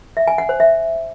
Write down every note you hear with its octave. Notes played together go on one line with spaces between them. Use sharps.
E5
G#5
F#5
C5
E5